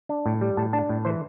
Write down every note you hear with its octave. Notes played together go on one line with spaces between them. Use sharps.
D4
A2
G3
A2 A5
D4 A5
A2
E3 C5